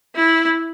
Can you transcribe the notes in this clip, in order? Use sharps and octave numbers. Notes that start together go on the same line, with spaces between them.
E4